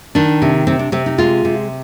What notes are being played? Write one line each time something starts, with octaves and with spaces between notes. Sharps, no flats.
D#3 D4
C3
C3 C4
D4
C3 C4
D#4
G#3 F4
C3